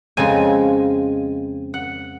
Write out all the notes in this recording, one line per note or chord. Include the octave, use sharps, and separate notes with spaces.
F2 C#3 G#3 G#5
F#5